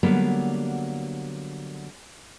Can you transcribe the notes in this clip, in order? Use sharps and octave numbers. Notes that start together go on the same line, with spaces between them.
D3 F#3 G3 A#3 B3